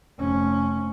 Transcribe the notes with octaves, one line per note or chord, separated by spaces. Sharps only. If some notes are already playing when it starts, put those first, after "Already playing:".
F1 C#4